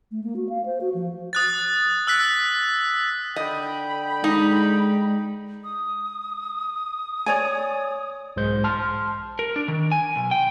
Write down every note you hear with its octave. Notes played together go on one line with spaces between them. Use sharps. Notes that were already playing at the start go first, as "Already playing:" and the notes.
A3
A#3
F#4
F5
C5
F#4
F3
D#6 F#6 A6
E6 F#6 B6
D3 D#5 G5 B5
G#3 D#4
D#6
C#5 D5 G#5
B1 G#2 G#3 C5 G6
A5 C6 F6
A#4
D4
D#3
G#5
B1
G5